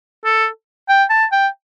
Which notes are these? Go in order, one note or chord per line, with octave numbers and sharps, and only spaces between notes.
A4
G5
A5
G5